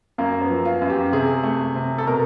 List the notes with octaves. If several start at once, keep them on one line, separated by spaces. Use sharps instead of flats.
F#2 A#3
B3
F3
F4
F#2
G4
C3 G#4
A3
C3
A4
B2 A#4